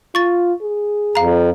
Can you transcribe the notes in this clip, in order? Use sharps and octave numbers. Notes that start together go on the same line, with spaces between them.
F4 C#6 A6
G#4
F2 F5 A#5